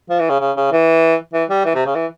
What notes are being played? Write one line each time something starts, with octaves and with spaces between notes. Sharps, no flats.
F3
E3
C#3
C#3
C#3
E3
E3
G3
E3
C3
C#3
E3